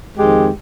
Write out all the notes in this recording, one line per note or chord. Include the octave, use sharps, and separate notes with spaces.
F2 D#3 G#3 C4 G4